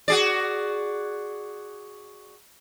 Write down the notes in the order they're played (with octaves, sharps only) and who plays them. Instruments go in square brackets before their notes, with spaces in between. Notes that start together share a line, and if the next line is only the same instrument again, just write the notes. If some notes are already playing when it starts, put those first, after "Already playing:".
[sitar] F#4 G#4 D5